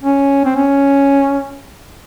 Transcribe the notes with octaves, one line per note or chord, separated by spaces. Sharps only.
C#4
C4
C#4